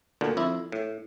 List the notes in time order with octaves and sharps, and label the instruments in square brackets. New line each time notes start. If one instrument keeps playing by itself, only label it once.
[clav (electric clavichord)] D2 A#2 D3
F2 E4
A2